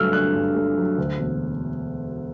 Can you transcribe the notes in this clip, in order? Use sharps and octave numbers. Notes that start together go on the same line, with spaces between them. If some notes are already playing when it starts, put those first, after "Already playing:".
Already playing: G2 D3 F#3 A3 E6 F6
D3 F#6
G2
A3
F#3
D2
E1